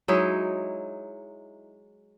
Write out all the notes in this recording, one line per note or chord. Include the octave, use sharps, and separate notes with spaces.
F#3 G#3 D#4 E4